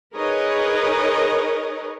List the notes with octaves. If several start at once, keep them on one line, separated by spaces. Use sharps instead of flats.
D#4 G#4 A#4 B4 C#5 D#5